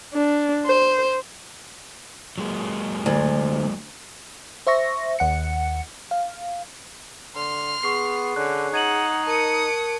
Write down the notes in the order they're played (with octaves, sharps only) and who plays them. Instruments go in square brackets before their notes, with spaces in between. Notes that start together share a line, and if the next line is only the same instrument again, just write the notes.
[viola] D4
C5
[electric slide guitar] F#3 G#3 A#3
[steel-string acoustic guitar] D2
[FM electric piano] C5 E5 C#6 A#6
D#2 F#5 C#7
F5
[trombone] D3 [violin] C6 F6
[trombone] B3 [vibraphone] G#4 [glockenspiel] C#6 C7
[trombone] D3 [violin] C#4 [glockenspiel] F#6
[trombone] D#4 [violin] F#5 [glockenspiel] G#6 D#7 F#7
[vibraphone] A#4 A5 [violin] D#6 C#7